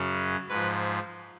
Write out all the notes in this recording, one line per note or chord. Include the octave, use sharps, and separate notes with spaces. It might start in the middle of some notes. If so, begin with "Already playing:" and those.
Already playing: F#2 C#3 F#3
G#2 F3 B4